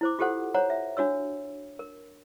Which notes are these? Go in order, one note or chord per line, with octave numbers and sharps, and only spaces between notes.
E4 C5 D6
F4 G4 A4 C5 F#5
C5 C#5 F#5 A#5
E5
D4 F#4 C#5 E6
A#4